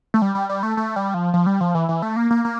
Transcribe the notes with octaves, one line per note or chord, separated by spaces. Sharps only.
A3
G3
G3
G3
A3
A3
G3
F3
F3
G3
F3
E3
E3
A3
A#3
A#3
A#3